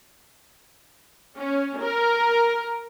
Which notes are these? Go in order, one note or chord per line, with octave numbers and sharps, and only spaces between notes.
C#4
A#4